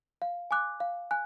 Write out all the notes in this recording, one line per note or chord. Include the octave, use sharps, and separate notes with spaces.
F5
G#5 D6 F#6
F5
G#5 F#6